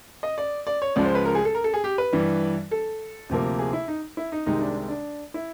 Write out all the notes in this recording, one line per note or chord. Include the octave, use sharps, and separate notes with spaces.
D#5
D5
D5
C#5
C#2 C#3 F3 G#3 D5
C5
B4
A#4
G#4
A4
A#4
A4
G#4
G4
B4
G2 E3 G3
A4
D2 C3 F3 A#3
G#4
E4
D#4
E4
D#4
C2 C3 D#3 G#3 D#4
D4
D4
E4